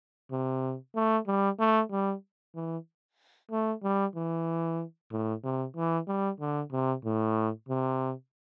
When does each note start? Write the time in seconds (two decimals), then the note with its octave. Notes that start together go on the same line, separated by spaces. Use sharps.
0.31 C3
0.95 A3
1.27 G3
1.59 A3
1.91 G3
2.55 E3
3.51 A3
3.83 G3
4.15 E3
5.12 A2
5.44 C3
5.76 E3
6.07 G3
6.40 D3
6.72 C3
7.05 A2
7.69 C3